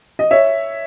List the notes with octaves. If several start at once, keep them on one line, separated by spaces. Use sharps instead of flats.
D#5
C#5 E5